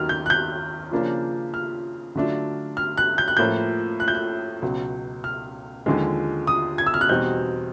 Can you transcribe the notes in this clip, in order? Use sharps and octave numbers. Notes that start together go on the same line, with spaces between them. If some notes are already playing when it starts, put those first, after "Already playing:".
Already playing: D#2 D#3 F#3 F6
G6
F#6
G6
C#3 F3 A#3 D4 F4
F6
D3 F#3 A3 D4 F4
F6
F#6
G6
F#6
A2 F3 A#3 G6
F#6
G6
F#6
C#2 B2 F#3
F6
D#2 D3 F3 G#3
D#6
G#6
E6
F6
F#6
E2 B2 G3 C4 D#4 G6